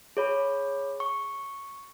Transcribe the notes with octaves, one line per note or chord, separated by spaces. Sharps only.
G#4 C#5 B5
C#6